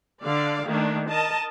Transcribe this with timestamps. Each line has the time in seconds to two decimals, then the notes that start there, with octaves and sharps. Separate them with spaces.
0.23 D3 D5 F5
0.68 D#3 A3 A#3 D4
1.09 A#4 D#5 A5